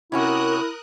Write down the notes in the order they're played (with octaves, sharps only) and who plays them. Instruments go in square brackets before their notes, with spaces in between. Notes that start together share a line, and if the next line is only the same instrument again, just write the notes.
[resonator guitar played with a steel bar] C3 C#4 F#4 [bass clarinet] E4 [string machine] A#4 D#6 F#6